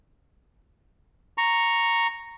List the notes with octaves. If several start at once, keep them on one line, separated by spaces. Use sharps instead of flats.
A#5 C#6